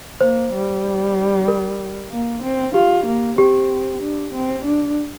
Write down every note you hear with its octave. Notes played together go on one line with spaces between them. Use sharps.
A#3 C5
G3
A#4
A#3
C4
F4 G4
A#3
C4 G4
D4
C4
D4